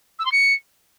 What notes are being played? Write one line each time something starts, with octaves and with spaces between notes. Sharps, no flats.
E6
C6
C#7